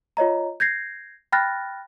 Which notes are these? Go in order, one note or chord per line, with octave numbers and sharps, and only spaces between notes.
F4 C#5 D#5 A#5
G6 G#6 A#6 C7
G5 B5 F6 F#6 A6 A#6